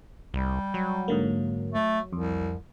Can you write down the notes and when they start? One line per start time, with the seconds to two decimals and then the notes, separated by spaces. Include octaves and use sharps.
0.34 C2 G3
0.74 F#3
1.08 G#2 D3 A#3
1.74 A3
2.13 C2 F2